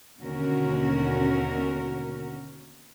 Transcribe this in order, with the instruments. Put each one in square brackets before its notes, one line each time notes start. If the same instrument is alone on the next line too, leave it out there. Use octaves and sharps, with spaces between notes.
[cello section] D#2 B2 D3 C#4 F#4 A#4